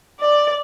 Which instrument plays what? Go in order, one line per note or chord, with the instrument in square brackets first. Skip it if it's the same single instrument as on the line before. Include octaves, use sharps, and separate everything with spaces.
[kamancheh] D5